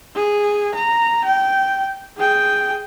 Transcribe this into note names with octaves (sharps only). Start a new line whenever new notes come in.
G#4
A#5
G5
G#4 G5